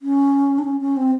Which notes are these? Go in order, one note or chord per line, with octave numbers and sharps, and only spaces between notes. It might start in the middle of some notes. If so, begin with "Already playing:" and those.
C#4
D4
C#4
C#4
C4